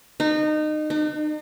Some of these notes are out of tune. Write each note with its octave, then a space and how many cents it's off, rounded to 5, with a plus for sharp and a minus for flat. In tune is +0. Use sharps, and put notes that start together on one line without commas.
D#4 -25
D#4 -45